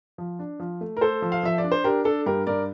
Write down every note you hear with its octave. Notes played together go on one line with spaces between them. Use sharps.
F3
D4
F3
A3
A#4
A3 A4 C5
F3
F5
F3 E5
D5
D4
C5
D4 G4 A#4
D4 A4
G2 G4 A#4
G2 A#4 D5